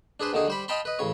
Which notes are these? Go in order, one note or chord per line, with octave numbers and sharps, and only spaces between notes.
D4 G#4 B4 C5
D#2 D3 D#3 D#4 G#4
G3 C5 B5
D#5 F5 G5 A5 B5 C6
B4 D#5
A1 C#3 C#5